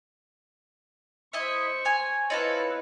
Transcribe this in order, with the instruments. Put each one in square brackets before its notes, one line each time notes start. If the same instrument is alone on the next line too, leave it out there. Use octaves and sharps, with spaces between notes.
[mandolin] E4 D#5 E5 [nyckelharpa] C5 C#6
[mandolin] C#5 G#5
[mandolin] C4 F4 A4 [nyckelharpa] E4 B4 [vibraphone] C#5 D#5